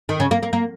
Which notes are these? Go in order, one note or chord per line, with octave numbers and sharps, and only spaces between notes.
D#3
C#3
A#3
A#3
A#3